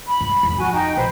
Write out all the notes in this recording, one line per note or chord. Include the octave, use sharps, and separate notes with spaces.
B5
G2
E2 G#2
F2 F#4 G#5
D#4 G5
A#1 B4 C5